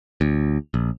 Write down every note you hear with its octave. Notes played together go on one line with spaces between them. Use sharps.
D2
A#1